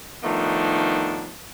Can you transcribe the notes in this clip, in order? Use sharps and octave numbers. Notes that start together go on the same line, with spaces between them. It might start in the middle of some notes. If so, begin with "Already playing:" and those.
D#3 F3 A3 B3 D4 D#4